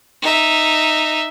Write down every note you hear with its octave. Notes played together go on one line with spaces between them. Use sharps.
D#4 E5